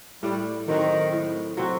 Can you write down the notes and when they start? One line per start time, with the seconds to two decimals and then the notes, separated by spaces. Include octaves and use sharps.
0.23 A2 G3
0.68 D#3 F#3 C4 F#4
1.13 A2
1.57 F#3 C4 F#4